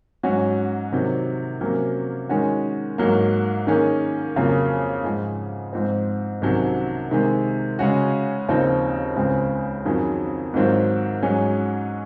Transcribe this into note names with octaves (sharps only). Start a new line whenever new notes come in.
G#2 F#3 C#4 F#4
C3 D#3 F#3
C3 F#3 A#3 C#4
D#3 G#3 C#4 F#4
G#2 F#3 A#3
D#3 A#3 C#4 G#4
F2 C#3 F#3 A#3 F4
G#2 F3 G#3
G#2 F3 C4
C2 C3 D#3 F#3 C#4
C3 D#3 G#3
C#3 G#3 C#4 F#4
D#2 C#3 F3 C4 D#4
C#2 C#3 G#3 C4
F2 D#3 F#3 C#4 G#4
G#2 D#3 F#3 C4 F4
G#2 F#3 C#4 G#4